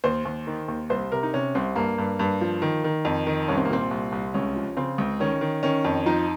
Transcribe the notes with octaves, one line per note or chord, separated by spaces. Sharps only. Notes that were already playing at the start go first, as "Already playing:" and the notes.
D#2 C5
D#2
D#3
D#2
C2 C5
C3 A#4
D#4
C3 C#4
C2 C4
G2 A#3
G2
G2
F3
D#3
D#3
F2
D#3
C2 C#4
C4
A#3
A#2 C4
C2
C2
C#2 C#4
F3
C#3 C4
C#2
D#3 C#4
D#3
D#3 C#4
F2
F3 D#4